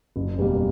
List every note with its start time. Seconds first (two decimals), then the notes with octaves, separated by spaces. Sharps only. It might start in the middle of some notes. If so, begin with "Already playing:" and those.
0.16 F#1
0.38 E2 B2 G3 A#3